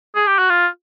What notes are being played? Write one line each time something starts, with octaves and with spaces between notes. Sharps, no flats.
G#4
G4
F#4
F4